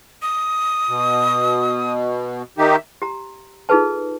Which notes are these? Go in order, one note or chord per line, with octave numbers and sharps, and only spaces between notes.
D#6
B2
D#3 D#4 G4 E5
G4 A#5
D#4 F4 G#4 A4 B4 A5